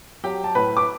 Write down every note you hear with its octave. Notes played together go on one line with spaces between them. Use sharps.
F#3 G4 G5
A5
A2 B4 B5
D6